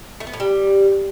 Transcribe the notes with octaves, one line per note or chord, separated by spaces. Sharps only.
A3
B3
A2
G3